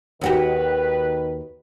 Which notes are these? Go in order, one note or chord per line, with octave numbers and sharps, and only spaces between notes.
D#2 D#3 F#4 G4 B4